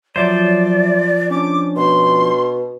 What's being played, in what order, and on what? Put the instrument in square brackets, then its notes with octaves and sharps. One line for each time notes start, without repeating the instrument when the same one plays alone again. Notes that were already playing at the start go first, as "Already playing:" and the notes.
[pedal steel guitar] F3 C5 [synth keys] F#3 E5 D6 [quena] D5
[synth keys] C#4 D4 [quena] D6
[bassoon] B2 [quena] C6